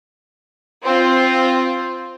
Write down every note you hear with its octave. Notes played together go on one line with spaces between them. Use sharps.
C4 F4